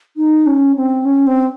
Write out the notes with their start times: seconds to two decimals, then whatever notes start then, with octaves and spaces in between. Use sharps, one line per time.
0.17 D#4
0.46 C#4
0.76 C4
1.05 C#4
1.27 C4